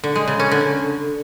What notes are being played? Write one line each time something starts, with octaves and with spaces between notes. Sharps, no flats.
D3
G#3
C#3
C#4
D3